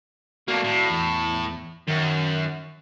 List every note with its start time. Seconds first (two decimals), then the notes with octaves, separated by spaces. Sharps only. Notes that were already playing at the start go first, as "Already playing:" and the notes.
0.48 A3 A#3 F#4 D5 F5
0.64 A2
0.90 E2
1.88 F#2 D#3 A#4